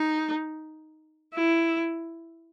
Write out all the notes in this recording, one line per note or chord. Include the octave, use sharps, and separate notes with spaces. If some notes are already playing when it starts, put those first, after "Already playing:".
Already playing: D#4
E4